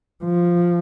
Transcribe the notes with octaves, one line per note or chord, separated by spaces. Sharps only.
F3